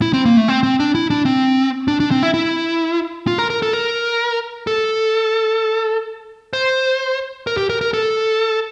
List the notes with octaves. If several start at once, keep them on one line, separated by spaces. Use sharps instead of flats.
E4
C4
A#3
A3
C4
C4
D4
E4
D4
C4
D4
D4
C4
E4
E4
F4
A#4
A#4
A4
A#4
A4
C5
A#4
G4
A#4
A#4
A4